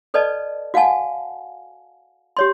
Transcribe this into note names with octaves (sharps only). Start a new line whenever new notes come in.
A4 B4 D5 D#5 A5
F#4 F5 F#5 G#5 A5
G4 C#5 C6